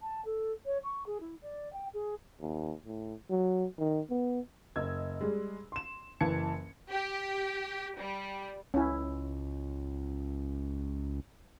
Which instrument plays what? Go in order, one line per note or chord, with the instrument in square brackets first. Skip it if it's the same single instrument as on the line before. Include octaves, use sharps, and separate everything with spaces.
[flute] A5
A4
C#5
C#6
G#4
E4
D5
G5
G#4
[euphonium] D#2
A2
F#3
D#3
B3
[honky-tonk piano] F#1 D#5 E6 G#6
G3 G#3
C6 E7
F#1 E3 A5 G#6 C#7
[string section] G4
G3
[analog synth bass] C#2 [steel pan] C#4 E4